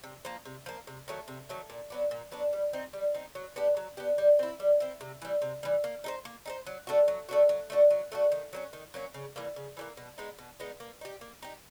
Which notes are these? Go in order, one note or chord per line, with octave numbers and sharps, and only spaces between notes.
C3
F3 A#3
C3
F3 A#3
C3
D#3 F#3 A3
C3
D#3 F#3 A3
A#2
F#3 B3 D4
A#2
F#3 B3 D4
G3
C4 D#4
G3
C4 D#4
F#3
B3 D4 G4
F#3
B3 D4 G4
G3
C4 E4
G3
C4 E4
C3
E3 G3
C3
E3 G3
A#3
D#4 G#4 C5
A#3
D#4 G#4 C5
F#3
A3 D4 F#4
F#3
A3 D4 F#4
F#3
A3 D4 F#4
F#3
A3 D4 F#4
D#3
F#3 A#3 C#4
D#3
F#3 A#3 C#4
C#3
E3 G3 A#3
C#3
E3 G3 A#3
B2
G#3 B3 D#4
B2
G#3 B3 D#4
A#3
D#4 G4
A#3
D#4 G4